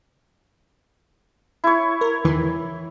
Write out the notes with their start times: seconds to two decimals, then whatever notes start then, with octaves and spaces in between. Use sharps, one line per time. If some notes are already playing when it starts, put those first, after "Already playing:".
1.64 E4 C#5
2.01 A#4
2.24 E2 D#3 E3